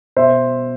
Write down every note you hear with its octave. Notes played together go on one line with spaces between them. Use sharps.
B2 C5 E5